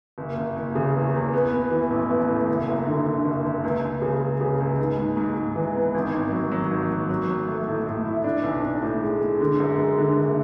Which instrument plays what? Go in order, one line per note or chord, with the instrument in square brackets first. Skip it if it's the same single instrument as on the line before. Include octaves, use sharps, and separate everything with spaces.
[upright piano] F#1
F#1
F#1
C#3
E2
E2
B3
B3
E3
A1
B3
A2
F#1
F#2
D3
D3
F#1
F#1
C#2
C#2
C#3
C#2
C#3
C#2
G#2
G#2
G#2
G#2
E3
B3
G#1
G#1
F#3
F#3
G#1
F#3
F#3
F#3
A3
A2
A2
E4
D4
B1
D4
A2
G#3
G#3
D3
F#2
G#3
D3
F#1